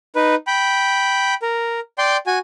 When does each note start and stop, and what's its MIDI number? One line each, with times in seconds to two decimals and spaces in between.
0.16 0.35 63
0.16 0.35 71
0.47 1.34 79
0.47 1.34 83
1.42 1.80 70
1.98 2.17 74
1.98 2.17 79
1.98 2.17 84
2.27 2.39 66
2.27 2.39 80